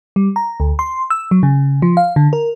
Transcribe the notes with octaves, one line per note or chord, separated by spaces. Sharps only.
G3
A#5
D2
C6
E6
F#3
C#3
F3
F5
D3
A#4